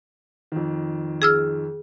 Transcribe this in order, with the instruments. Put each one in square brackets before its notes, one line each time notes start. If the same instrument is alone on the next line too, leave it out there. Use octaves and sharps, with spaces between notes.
[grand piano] F2 D#3
[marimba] G#4 E6 F6